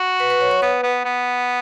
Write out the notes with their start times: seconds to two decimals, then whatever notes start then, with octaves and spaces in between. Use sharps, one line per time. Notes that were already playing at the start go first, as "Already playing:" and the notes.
Already playing: F#4
0.20 B4
0.30 B4
0.41 C#5
0.51 C#5
0.62 B3 B4
0.83 B3
1.05 B3